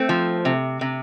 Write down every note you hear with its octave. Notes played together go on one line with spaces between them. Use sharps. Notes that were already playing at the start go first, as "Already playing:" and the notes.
Already playing: A3 C4
F3
C3
C3